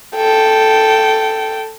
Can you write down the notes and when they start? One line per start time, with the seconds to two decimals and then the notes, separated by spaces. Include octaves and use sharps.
0.16 A4 G5